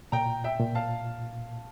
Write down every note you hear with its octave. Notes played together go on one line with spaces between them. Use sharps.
A#2 G5 A#5
E5 G5
A#2
F5 A5